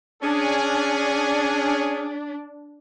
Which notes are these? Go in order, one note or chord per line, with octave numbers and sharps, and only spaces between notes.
C#4 D4 G#4